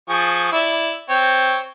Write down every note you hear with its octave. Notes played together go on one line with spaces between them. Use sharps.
F3 G#4 C#6
E4 D5 E5
C4 C#5